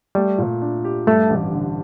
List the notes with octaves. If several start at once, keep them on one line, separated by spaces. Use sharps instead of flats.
G3 A3
A#2
D4
G4
G2 A3
A1
D3